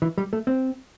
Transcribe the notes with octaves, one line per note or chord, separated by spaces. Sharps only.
E3
G3
A3
C4